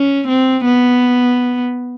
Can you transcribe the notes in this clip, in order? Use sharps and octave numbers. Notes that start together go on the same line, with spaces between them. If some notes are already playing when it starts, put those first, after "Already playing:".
Already playing: C#4
C4
B3